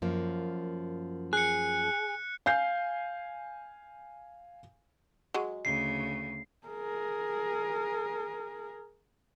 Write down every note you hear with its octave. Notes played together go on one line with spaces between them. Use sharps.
F#2 F3 A#3
G#4 F#6 C#7
F5 G#5 G6 C7
F#3 G#3
D2 C#3 C7
G#4 A#4